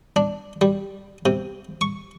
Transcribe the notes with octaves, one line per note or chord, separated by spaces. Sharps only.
D4
G3
C3
C#6